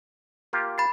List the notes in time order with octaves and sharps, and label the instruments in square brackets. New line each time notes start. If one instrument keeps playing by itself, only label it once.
[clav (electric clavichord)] A#3 F4 G4
[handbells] B5 A6 C7